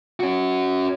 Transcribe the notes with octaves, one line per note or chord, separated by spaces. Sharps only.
C#4 F#4